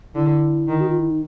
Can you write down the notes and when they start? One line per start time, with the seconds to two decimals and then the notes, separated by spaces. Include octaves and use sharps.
0.15 D3 E4
0.68 D#3
0.80 F#4
0.90 F4
1.00 E4
1.11 D#4